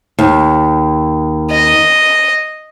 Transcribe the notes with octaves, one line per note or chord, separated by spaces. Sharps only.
D#2
D#5